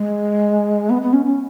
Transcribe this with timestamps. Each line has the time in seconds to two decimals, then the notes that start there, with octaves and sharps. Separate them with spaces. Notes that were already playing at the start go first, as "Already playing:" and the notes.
Already playing: G#3
0.89 B3
1.02 B3
1.13 C#4
1.25 C#4